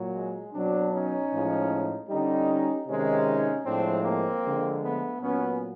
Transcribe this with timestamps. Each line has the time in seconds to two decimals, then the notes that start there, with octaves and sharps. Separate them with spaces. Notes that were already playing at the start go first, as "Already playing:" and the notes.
Already playing: A#2 F#3
0.13 G#3
0.52 B2 F#3 C4 D4
0.92 C#4 D#4
1.30 A2 F3 G#3
2.08 D3 G3 C#4 D#4
2.86 C3 D#3 G#3 C#4 D#4
3.64 A2 F3 G#3 C4 D4
4.03 A#3 C4
4.42 D3 F3 G#3
4.82 A3 B3
5.20 A#2 F#3 B3 C#4